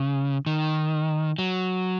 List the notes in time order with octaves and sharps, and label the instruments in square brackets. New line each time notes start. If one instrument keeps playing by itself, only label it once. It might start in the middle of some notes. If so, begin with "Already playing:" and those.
Already playing: [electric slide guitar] C#3
D#3
F#3